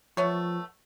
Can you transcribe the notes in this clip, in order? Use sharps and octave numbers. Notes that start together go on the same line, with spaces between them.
F3 A3 B3 C#5